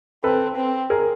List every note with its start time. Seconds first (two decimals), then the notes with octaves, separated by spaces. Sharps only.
0.24 C4 A4 B4
0.56 C4
0.90 G#4 A#4